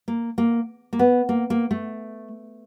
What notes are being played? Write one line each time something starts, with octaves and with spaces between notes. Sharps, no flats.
A#3
A#3
A#3
B3
A#3
A#3
A3